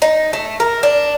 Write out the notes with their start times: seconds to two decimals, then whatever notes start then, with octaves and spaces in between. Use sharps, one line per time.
0.02 D#4
0.33 A3
0.60 A#4
0.83 D4